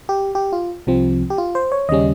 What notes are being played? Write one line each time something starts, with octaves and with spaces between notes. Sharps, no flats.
G4
G4
F4
C2 C3 F3 C4
G4
F4
C5
C#5
D#2 C#3 G3 C#4 D#5